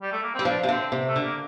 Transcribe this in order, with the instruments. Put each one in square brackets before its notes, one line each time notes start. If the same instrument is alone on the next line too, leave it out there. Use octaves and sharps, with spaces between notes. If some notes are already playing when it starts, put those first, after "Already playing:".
[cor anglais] G3
A3
A#3
[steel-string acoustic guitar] G3 [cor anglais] C4
[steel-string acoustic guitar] F3 [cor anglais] D4
[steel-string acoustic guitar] C3
[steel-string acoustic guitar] D3 [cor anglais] C4
[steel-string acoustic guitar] C3
[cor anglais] A3
[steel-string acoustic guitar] D3
[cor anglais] A#3